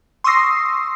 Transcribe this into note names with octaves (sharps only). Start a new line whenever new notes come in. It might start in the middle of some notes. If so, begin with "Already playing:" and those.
C6 C#6 D#6 E6 A#6 C7